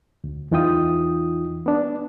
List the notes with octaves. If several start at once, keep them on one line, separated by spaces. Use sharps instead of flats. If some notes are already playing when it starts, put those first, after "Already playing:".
D2
E2 E3 D#4 F4 G5 D#6
B3 D4